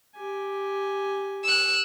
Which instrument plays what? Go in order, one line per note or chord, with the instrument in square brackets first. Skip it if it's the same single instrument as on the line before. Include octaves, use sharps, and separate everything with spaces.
[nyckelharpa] G4 G#5
[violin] E6 F#6